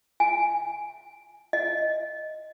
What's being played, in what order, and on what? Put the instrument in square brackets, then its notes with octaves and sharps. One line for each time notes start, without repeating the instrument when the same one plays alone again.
[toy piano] G#5
D#5